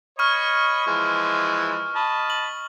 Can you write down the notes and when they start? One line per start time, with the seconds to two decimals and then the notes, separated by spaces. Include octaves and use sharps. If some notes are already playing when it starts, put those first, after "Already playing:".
0.19 C#5 D#5 B5 C#6 F6
0.87 E3 F3 G#3
1.96 D#5 A5 B5
2.30 F#7